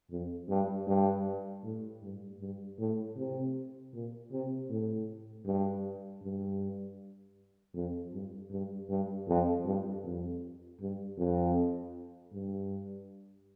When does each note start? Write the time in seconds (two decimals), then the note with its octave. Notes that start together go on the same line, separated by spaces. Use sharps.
0.11 F2
0.49 G2
0.87 G2
1.64 A2
2.03 G2
2.40 G2
2.79 A2
3.16 C3
3.93 A#2
4.32 C3
4.70 A2
5.46 G2
6.22 G2
7.74 F2
8.13 G2
8.51 G2
8.89 G2
9.28 F2
9.65 G2
10.04 F2
10.81 G2
11.18 F2
12.33 G2